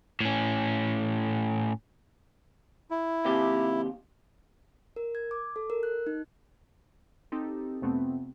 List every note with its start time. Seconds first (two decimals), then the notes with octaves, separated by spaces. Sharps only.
0.21 A2 C#4
2.91 E4
3.25 D#2 C3 G4
4.96 A#4
5.15 G#6
5.31 D6
5.56 A4
5.70 A#4
5.83 F#6
6.07 D#4
7.32 C4 D#4 G4 A4
7.82 F2 C3 A3 B3 C4